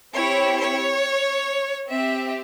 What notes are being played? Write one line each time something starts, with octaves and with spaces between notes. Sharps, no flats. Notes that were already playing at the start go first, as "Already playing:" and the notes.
C4 E4 G4 C#5
C#5
C4 G4 E5